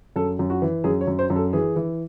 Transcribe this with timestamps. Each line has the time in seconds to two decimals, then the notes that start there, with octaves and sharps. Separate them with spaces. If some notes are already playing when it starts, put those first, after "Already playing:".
0.16 F#2 A4
0.39 F#2
0.50 F#4
0.62 E3
0.84 F#2 G#4
1.01 C#5
1.07 F#2
1.19 C5
1.30 F#2
1.36 A4
1.53 E3 G#4
1.76 E3